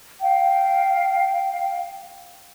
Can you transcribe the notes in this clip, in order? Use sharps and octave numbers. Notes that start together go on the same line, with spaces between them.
F5 G5